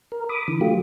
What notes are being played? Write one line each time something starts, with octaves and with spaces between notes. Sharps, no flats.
A#4
B5 D6 D#6
D3 E3
F#3 A3 F4 G4